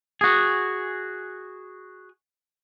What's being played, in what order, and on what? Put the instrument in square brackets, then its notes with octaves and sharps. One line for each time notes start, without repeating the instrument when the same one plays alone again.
[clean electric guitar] F#4 G#4